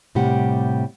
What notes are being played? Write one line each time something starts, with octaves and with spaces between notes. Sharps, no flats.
A2 C3 G3 G4 F#5